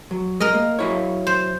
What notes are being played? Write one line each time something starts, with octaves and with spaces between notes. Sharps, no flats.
F#3
G#3 A#4 D#5
A#3
F#3 E4 C#5
C5